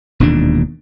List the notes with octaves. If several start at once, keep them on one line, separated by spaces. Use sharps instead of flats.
E1 D#2 A#2 D4